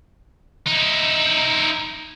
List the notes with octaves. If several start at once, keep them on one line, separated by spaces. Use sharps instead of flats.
D#4 E4